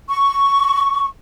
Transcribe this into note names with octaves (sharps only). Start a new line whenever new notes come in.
C#6